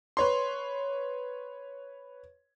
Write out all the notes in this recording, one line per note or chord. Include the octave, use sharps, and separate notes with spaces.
B4 C#5 C6